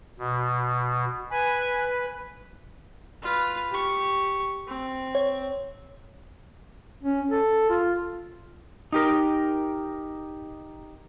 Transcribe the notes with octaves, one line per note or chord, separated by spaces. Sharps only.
B2
B4 G#5
F4 B4
G4 C#6
C4
C#5
C#4
A4
F4
D#4 G4 A#4